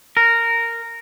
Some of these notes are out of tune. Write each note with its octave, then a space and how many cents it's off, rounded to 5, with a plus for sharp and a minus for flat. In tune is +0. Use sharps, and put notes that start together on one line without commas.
A#4 -10